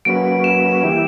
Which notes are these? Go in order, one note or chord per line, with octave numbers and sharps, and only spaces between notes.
F#3 A#3 C#4 F#4 B4 D7
E7
E3 G3 A#3 E4 G4